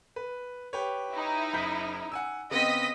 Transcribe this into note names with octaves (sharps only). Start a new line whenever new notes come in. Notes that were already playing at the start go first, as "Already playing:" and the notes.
B4
G4 B4 C#5
D#4 E4
F#1 G6 B6
F#5 G#5 E6
C#3 B3 C4 D#5 B6